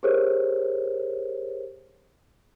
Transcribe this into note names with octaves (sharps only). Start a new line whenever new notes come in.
G4 G#4 A#4 C5 C#5